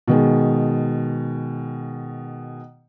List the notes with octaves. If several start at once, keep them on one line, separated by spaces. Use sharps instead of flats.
B2 D#3 G#3